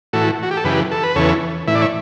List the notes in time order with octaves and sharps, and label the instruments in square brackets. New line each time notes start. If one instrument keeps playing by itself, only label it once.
[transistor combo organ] A2 E3 F#4 A4
F#4
G4
A4
F#2 C#3 E3 G4 B4
A4
B4
E2 C#3 E3 A4 C#5
A2 E3 E5
D5
C#5 E5